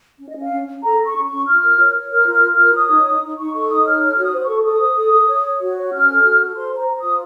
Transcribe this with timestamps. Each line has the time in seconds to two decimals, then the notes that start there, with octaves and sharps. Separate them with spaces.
0.20 C#4
0.30 D#5
0.36 C#4
0.41 F5
0.52 C#4
0.68 C#4
0.83 A4 A#5
1.00 A4
1.05 C#6
1.16 C#4
1.26 C#4 C#6
1.47 F4 F6
1.63 A#4
1.79 C#5
1.95 C#5
2.11 A#4 F6
2.26 F4
2.33 F6
2.43 F4
2.54 F6
2.59 A#4
2.74 C#5 D#6
2.90 D#4
3.06 D#4
3.22 D#4
3.38 D#4 C#6
3.54 A4 C#6
3.70 D#4 D#6
3.85 C#5 F6
4.02 A4 F6
4.16 F#4 F6
4.23 D#6
4.33 C5
4.44 C#6
4.49 A4
4.65 A4 D#6
4.81 C5
4.97 A4
5.13 A4
5.28 C#5
5.45 C#5
5.60 F#4
5.77 C#5
5.92 C#4 F6
6.09 A4
6.24 F#4
6.40 A4
6.56 C5 C6
6.72 C5 A#5
6.88 C5
6.98 D#6
7.04 F4